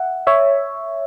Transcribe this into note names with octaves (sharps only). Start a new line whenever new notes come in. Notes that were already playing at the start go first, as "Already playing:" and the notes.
Already playing: E5 F#5
C#5 E5